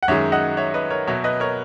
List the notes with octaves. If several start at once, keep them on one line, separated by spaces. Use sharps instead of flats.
F#5
F#2 D#3 G#3 C#5 E5
D#5 F#5
C#5 E5
B4 D#5
A#4 C#5
B2 F#3 C#5 E5
B4 D#5
A#4 C#5